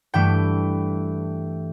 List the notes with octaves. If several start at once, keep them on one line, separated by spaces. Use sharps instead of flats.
G2 E3 A3 G5